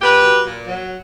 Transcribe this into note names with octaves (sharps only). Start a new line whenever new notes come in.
A#2 G4 B4
F#3
A#2
F#3